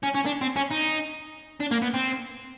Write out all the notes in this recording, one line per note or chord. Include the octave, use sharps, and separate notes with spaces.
C#4
C#4
D4
C4
C#4
D#4
D4
A#3
B3
C4